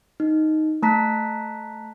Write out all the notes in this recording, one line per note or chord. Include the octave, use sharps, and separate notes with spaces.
D#4
A3 A5 A#5 F#6 B6